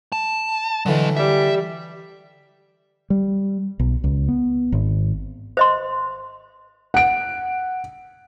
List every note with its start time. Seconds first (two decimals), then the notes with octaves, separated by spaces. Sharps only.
0.12 A5
0.86 D3 E3 F#3 D#5
1.17 G3 E5
3.10 G3
3.79 B1
4.04 C#2
4.28 B3
4.72 G#1
5.57 C5 D#5 C6
6.94 F#5 D7